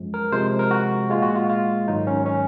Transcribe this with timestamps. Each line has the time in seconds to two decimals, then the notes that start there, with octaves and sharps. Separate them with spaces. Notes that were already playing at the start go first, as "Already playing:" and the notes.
Already playing: F#2 F3 G#3
0.14 A#4
0.32 C3 F3 G#3 C5
0.59 A#4
0.71 F#4
1.10 A#2 G#3 F4
1.22 F#4
1.35 F4
1.50 F4
1.87 G#2 D#3 F#3 D#4
2.07 C#4
2.26 C#4